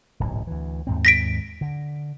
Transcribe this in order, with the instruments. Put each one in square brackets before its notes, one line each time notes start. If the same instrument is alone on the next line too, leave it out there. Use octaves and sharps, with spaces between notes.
[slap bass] D1 B1 G#2
D2 E3
D#2 G#2 C4
[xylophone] A#6 B6 D7
[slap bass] D3